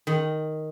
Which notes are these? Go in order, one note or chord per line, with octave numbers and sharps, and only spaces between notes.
D#3